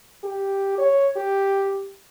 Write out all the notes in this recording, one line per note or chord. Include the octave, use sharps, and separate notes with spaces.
G4
C#5
G4